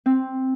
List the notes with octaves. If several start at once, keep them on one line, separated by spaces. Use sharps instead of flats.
C4